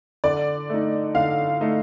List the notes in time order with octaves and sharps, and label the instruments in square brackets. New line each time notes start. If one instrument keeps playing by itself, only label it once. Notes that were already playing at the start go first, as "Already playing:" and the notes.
[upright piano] D3 [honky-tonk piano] D5
[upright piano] A3 D#4
[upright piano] D3 [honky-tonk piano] F5
[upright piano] A3 D#4